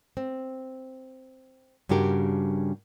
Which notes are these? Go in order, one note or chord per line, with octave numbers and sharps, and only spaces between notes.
C4
G2 C#3 D4 F#4 G4 A#4